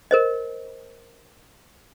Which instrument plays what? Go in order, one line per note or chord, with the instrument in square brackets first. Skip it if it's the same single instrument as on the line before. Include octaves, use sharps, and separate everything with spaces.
[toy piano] A#4 C5 D#5